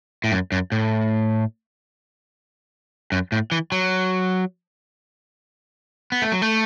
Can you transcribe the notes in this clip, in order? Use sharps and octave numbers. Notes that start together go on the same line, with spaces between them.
A2
F#2
F#2
A2
F#2
A2
E3
F#3
B3
A3
F#3
A3